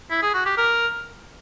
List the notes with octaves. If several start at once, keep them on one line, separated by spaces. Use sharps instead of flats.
E4
G#4
F#4
G4
A#4